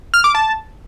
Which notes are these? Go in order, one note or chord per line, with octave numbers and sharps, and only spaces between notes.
F6
D6
A5